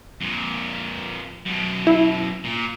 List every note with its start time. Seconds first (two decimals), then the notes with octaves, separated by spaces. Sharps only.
0.21 F2 A#2
1.46 F#2 B2
1.87 E4
2.45 A#2